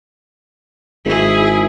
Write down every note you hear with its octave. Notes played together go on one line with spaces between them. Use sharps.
G#1 E4 G#4